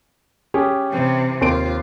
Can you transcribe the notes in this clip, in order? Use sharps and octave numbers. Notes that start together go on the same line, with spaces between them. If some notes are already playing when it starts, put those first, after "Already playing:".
C#4 G4 G#4
C3 E3
D#2 C4 F4 D7